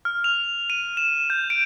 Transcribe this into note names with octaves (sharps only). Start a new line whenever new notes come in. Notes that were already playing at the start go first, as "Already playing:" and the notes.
F6
F7
D#7
E7
G6
D7